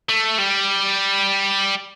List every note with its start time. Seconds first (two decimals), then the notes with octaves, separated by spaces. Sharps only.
0.09 A3
0.38 G3